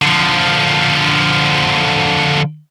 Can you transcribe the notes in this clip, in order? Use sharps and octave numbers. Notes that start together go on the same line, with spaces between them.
D3 F3